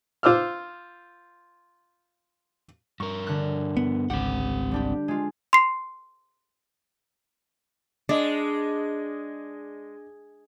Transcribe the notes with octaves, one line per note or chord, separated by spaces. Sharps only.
F4 C5 D6 E6 F6
G2 A#4 C#6
D3 F#6
B3
G#1 C#2 C4 G4 F#5
G3 D4 G4
G#3 F4
C6 C7
G#3 D4 D5 D#5